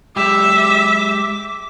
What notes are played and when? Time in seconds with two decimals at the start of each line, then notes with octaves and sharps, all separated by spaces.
0.16 G#3 G4 E5 D6